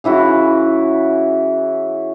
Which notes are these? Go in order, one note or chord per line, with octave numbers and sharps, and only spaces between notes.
C#3 E3 E4 F#4